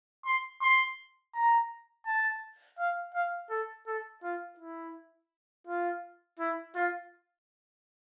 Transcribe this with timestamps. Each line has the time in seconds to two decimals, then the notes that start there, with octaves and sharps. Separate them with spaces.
0.26 C6
0.62 C6
1.35 A#5
2.06 A5
2.79 F5
3.14 F5
3.50 A4
3.87 A4
4.23 F4
4.59 E4
5.67 F4
6.40 E4
6.75 F4